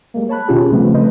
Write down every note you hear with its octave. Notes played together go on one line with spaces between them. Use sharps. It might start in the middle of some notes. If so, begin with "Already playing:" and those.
G3 G#3 A#3
C#5 A5 B5 F#6
B2 D#3 C#4 F4 G4 G#4
C#3 F3 G3 A3 B3 C4
A3 B4 C5 D#5